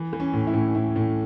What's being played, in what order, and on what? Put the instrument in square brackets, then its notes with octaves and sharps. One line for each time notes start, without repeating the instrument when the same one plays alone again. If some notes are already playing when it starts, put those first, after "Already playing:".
Already playing: [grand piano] E3
E3
C#4
A2
E4
A2
A2 E4
A2